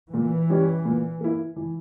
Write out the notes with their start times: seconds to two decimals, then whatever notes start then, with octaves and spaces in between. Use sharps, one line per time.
0.13 A#2 E3
0.50 G3 C#4 G4
0.85 A#2
1.21 A#3 E4
1.56 E3